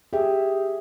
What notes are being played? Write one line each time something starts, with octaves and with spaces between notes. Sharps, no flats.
G4 G#4 E5